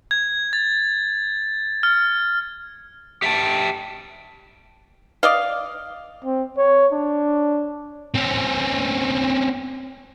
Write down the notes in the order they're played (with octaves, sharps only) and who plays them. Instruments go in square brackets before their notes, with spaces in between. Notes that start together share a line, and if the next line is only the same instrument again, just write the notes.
[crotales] G#6
A6
F6
[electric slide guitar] G4 E5 G5 A5
[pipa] D5 D#5 F5
[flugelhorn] C4
C#5
D4
[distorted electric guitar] C4 C#4